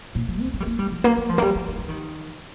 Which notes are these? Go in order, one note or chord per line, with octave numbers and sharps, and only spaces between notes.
A#2
F3
C4
A#3
G3
A#3
G3
F3
A#3
A#3
F3
A#3
G3
F3
D#3
F3
D#3